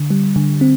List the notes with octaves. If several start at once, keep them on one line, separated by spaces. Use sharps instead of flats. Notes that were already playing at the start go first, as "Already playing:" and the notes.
Already playing: D3
G3
D3
C4